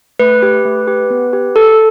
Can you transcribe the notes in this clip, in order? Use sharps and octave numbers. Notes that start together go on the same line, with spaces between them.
A3 B4
G4
A3
G4
B3
G4
A4